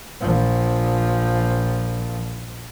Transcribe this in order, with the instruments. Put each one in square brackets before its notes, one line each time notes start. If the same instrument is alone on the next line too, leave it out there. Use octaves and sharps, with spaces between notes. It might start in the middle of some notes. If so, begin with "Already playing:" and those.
[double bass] A#1 F3